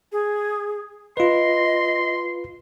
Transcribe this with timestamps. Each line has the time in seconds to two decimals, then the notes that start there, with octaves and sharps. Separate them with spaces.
0.12 G#4
1.17 F4 B4 D#5 C6